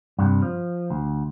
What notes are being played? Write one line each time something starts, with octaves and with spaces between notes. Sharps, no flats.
G2 C3
F3
D2